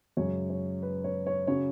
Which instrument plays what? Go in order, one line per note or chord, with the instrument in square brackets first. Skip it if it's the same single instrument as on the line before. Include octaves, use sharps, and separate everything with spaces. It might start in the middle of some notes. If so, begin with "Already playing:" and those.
[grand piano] F#2 C#3 G#3 C#4 C#5
C#5
B4
C#5
C#5
C#3 F#3 C#4 C#5